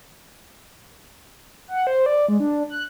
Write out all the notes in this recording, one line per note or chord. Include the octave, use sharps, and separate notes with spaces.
F#5
C5
D5
G#3
D4
F#6